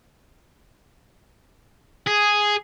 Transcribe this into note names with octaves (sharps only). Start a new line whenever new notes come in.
G#4